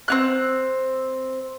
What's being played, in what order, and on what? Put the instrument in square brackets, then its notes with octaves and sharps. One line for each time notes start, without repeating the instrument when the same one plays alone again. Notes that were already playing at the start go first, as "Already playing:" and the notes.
[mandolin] C4 C#4 F#6